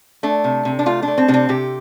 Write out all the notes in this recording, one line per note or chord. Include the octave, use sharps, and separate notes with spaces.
A3 D4
C3
C3
D4
A3 F4
D4
A3
C4
C3 D4
C4
C3 G4